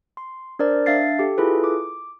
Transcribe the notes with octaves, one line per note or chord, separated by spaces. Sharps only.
C6
D4 A#4 C5 D5
D4 E5 F5 A6 C7
G4 A4
E4 F4 G#4 A4 B4
D6